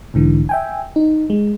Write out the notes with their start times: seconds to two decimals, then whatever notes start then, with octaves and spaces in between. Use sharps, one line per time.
0.14 B1 G#2 D3 E3
0.49 E5 G5 G#5
0.96 D#4
1.30 G#3